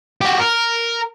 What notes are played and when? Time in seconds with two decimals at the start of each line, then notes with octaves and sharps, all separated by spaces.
0.21 F#4 G4
0.40 A#4